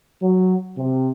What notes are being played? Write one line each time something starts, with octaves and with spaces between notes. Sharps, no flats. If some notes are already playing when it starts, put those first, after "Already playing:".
F#3
C3